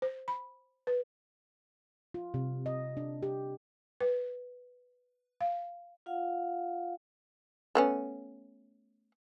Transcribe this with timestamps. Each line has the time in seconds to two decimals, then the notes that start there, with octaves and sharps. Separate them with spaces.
0.02 C5
0.28 B5
0.87 B4
2.14 F4
2.34 C3
2.66 D#5
2.97 D4
3.23 G4
4.01 B4
5.41 F5
6.06 F4 F5 F#5
7.75 A3 B3 C#4